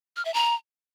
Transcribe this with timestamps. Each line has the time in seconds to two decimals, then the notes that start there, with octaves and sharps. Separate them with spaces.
0.16 F6
0.25 E5
0.34 A#5